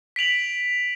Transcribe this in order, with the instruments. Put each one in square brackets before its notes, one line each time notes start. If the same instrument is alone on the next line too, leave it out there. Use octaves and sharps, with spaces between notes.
[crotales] B6 D7 F7 F#7